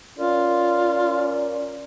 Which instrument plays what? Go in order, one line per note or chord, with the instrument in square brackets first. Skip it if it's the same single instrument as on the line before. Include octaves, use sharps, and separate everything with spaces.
[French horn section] C#4 A#4 D5 [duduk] F4